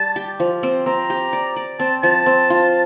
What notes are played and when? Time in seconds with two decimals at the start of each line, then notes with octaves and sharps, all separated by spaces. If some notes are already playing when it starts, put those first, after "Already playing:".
Already playing: G3 A5
0.16 G4
0.40 F3
0.63 C4
0.86 C4 A#5
1.10 G4
1.33 D5
1.56 D5
1.80 C4 A5
2.03 F3 A5
2.26 C4
2.50 F4